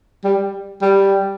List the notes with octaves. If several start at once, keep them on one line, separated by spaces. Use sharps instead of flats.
G3
G3